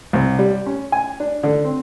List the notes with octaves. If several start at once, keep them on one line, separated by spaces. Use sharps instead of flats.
C2
G3
C#4
G#5
D4
D3
C4